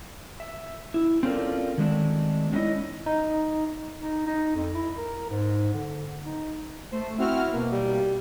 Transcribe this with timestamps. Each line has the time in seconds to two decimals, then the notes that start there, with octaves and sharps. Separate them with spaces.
0.40 E5
0.94 E4
1.23 C4 C#4 F4 A4 A#4 D5
1.78 D#3 F#3 G#3 A3 C4 D4
2.52 G#3 C4 C#4 D#4 E4 D#5
3.06 D#4
4.00 D#4
4.27 D#4
4.55 F2
4.74 E4
4.97 A#4
5.29 G#2
5.74 D3
6.25 D#4
6.92 A3 C5
7.18 C4 E4 F#4 F6
7.52 B2 A#3
7.72 G3